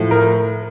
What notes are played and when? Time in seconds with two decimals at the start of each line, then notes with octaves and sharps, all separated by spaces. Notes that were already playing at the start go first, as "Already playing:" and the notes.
Already playing: A2 F3
0.11 A#4